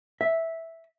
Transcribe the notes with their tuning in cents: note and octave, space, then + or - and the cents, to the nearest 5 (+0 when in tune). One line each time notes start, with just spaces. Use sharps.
E5 -5